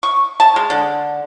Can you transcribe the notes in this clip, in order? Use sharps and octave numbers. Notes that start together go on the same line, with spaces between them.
C#6
A5
G#3
D3